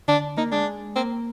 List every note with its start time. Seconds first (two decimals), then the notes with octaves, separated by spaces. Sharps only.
0.08 D3 D4
0.37 A#3 D#4
0.52 G#3 D4
0.96 A#3 C4